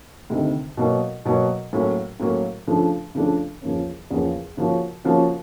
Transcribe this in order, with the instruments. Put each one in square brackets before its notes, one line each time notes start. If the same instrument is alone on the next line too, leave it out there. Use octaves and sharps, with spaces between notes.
[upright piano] D2 C3 D#3
B2 F#3 A#3
B2 F#3 A#3
A2 F#3 A#3 C#4
A2 F#3 A#3 C#4
C#3 F3 A3 D4
C#3 F3 A3 D4
E2 C#3 F3 A#3 C#4
E2 C#3 F3 A#3 C#4
C#3 F3 A#3 C#4 F#4
C#3 F3 A#3 C#4 F#4